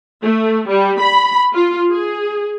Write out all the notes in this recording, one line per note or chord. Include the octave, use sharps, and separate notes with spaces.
A3
G3
B5
F4
G#4